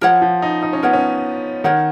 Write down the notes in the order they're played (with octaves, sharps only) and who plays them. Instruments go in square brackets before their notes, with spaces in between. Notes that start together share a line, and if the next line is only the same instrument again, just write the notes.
[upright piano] F3 [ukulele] A#4 C#5 F#5
[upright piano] F3
D#4
D#4
C#4
[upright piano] B3 [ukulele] A#4 C#5 F#5
[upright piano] C#4
[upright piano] D#3 [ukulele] A#4 C#5 F#5